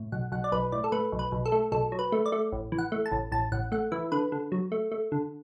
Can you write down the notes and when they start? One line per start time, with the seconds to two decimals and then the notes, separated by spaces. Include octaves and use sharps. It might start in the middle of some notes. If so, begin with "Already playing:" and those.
Already playing: A2
0.12 B1 F#5
0.32 B1 F#5
0.44 D5
0.52 B1 B4
0.72 A2 D5
0.84 A4
0.92 A3 B4
1.12 B1
1.19 B4
1.32 B1
1.46 A4
1.52 A3
1.72 B1 A4
1.92 F#3
1.99 B4
2.12 A3
2.26 D5
2.32 A3
2.52 A1
2.72 E3
2.78 F#5
2.92 A3
3.06 A5
3.11 A1
3.32 A1 A5
3.52 A1 F#5
3.72 A3 F#5
3.92 E3 E5
4.12 D3 B4
4.32 D3
4.52 F#3
4.72 A3
4.92 A3
5.12 D3